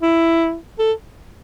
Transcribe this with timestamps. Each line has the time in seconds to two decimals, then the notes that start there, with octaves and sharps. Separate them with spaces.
0.02 E4
0.79 A4